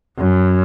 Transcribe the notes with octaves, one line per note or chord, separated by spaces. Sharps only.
F#2